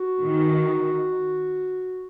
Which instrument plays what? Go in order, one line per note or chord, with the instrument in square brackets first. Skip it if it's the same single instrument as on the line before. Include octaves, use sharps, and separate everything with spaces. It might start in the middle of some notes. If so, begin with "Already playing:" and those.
Already playing: [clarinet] F#4
[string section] D#3